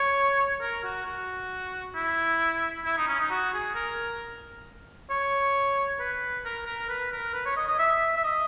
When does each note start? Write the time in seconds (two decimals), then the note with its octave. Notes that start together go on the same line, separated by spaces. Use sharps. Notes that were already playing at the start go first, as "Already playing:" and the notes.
Already playing: C#5
0.61 A#4
0.84 F#4
1.05 F#4
1.95 E4
2.85 E4
2.97 D#4
3.07 C#4
3.19 D#4
3.31 F#4
3.53 G#4
3.75 A#4
5.10 C#5
6.00 B4
6.45 A#4
6.66 A#4
6.89 B4
7.12 A#4
7.34 B4
7.46 C#5
7.56 D#5
7.68 D#5
7.79 E5
8.17 E5
8.24 D#5